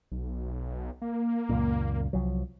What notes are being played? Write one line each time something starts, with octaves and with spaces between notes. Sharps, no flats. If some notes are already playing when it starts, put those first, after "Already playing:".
B1
A#3
C#2 F#2 A#2
C2 F3 F#3